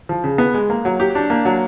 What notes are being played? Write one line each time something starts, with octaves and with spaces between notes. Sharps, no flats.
F3
C#3
B3
G#3
A#3
F#3
G4
D4
A#3
F#3